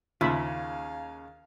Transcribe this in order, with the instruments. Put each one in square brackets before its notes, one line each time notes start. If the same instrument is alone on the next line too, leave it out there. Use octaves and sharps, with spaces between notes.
[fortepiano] D#2 [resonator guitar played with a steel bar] C#3 [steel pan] F4 E5 B5 [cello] F5